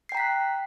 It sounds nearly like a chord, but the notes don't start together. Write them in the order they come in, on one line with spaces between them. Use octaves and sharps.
C7 G5 A#5 B6 F#6